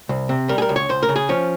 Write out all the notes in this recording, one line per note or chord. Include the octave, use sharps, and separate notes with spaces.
C2
C3
G3 A#4
G#4
A#4
C#2
C#5
C#2 C5
A#4
C#3
G#4
F3 C#4